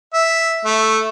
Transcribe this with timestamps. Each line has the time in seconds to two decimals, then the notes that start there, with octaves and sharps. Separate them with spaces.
0.14 E5
0.65 A3